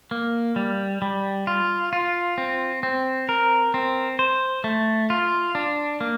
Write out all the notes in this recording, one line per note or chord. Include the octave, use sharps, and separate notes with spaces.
A#3
G3
G3
F4
F4
C4
C4
A#4
C4
C5
A3
F4
D4
A#3